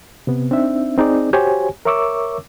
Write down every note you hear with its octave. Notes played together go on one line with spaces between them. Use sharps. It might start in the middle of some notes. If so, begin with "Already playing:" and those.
C3 B3
C4 D4 D#4 E5
C4 D#4 G#4 D5
F#4 G4 C5 C#5 G#5
A#4 C#5 E5 C#6 D6 E6